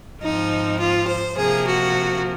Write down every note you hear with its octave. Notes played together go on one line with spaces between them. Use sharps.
G#2 F3 C4 D#4
F4
C5
C3 F3 A#3 G#4
F#4